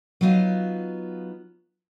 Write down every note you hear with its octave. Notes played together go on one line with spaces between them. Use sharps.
F#3 B3 D#4 F4 F5